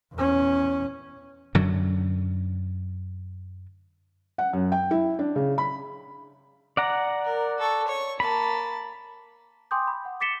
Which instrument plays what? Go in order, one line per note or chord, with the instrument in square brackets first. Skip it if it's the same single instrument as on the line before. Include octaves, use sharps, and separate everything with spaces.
[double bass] E2 C#4
[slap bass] F#2 D3 F#3
[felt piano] F#5
F#2
G5
E4
D4
C#3
B5
[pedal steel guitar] D5 F#5 A#5
[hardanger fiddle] A#4
A4 C#6
C#5 C#6
[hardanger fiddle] A#3 A5 [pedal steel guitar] B5
[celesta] G5 G#5 C6 D6 D#6 G6
B5
F#5
D6 A6 B6 C#7 E7 G7